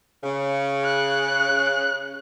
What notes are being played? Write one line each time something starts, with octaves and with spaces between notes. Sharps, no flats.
C#3
F#6